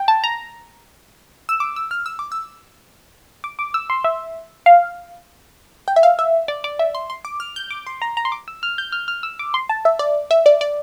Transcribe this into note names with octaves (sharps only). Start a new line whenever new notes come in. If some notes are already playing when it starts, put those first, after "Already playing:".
Already playing: G5
A5
A#5
E6
D6
E6
F6
E6
D6
E6
D6
D6
E6
C6
E5
F5
G5
E5
F5
E5
D5
D5
E5
C6
C6
D6
F6
G6
D6
C6
A#5
A#5
C6
D6
E6
F6
G6
F6
F6
E6
D6
C6
A5
E5
D5
E5
D5
D5